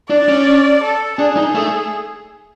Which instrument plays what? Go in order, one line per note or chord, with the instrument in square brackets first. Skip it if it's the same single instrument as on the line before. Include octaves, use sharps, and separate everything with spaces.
[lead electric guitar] D4 [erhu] D5
[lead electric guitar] C#4
[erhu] A4
[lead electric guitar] D4 [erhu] G#4
[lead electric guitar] D#4
A3